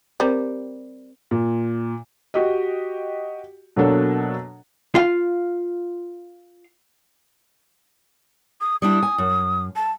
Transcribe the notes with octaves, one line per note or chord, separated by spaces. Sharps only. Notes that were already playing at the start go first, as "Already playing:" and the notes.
G3 C4 A#4 C5
A#2
F#4 G4 D#5
B2 F#3 A#3 D4 A4 C#5
F4 F5
D#6
G3 D4 E4 D#6
G#5
F#2
A5